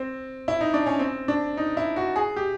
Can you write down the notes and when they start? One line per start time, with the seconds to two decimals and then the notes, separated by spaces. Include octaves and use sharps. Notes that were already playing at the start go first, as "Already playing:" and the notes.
Already playing: C4
0.48 E4
0.61 D#4
0.74 D4
0.86 C#4
0.99 C4
1.28 D4
1.57 D#4
1.77 E4
1.96 F#4
2.16 G#4
2.36 G4